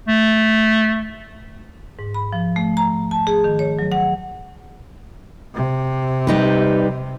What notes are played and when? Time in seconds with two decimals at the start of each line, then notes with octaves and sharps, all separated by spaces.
0.08 A3
1.99 G#2
2.14 B5
2.33 F3
2.56 A3
2.77 A#5
3.11 A5
3.27 G#4
3.44 D#3
3.59 C#5
3.79 F#3
3.92 F#5
5.54 C3
6.27 G3 D#4 B4